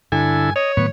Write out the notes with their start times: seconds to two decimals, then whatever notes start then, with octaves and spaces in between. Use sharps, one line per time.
0.12 G2 D3 E4 A4 G#5
0.56 C#5 D#5
0.77 A2 D#3 F#3 B3 C#6